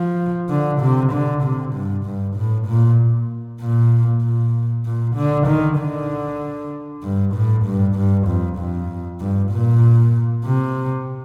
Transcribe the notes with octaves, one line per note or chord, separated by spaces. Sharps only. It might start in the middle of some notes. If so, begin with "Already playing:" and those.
Already playing: F3
D3
C3
D3
C3
G2
G2
A2
A#2
A#2
A#2
A#2
D3
D#3
D3
G2
A2
G2
G2
F2
F2
G2
A#2
C3